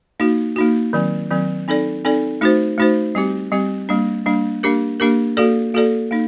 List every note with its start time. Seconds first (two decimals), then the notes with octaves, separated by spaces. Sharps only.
0.20 A#3 D#4 F#4
0.56 A#3 D#4 F#4
0.93 D#3 F#3 C4
1.30 D#3 F#3 C4
1.68 C4 D#4 A4 D5
2.05 C4 D#4 A4 D5
2.41 A3 D#4 F#4 C5
2.78 A3 D#4 F#4 C5
3.15 G3 C4 G4
3.52 G3 C4 G4
3.89 G3 A#3 D4
4.26 G3 A#3 D4
4.63 A#3 D4 G4 A#4
5.00 A#3 D4 G4 A#4
5.37 A#3 F#4 A4 D5
5.74 A#3 F#4 A4 D5
6.11 A#3 D#4